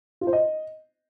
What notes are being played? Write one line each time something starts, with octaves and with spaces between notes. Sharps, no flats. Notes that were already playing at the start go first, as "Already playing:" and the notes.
F4
C5
D#5